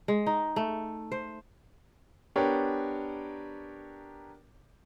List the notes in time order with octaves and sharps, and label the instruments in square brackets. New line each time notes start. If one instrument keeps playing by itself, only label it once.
[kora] G#3
D#4
A3
C5
[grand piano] B3 D4 G4 A#4 C#5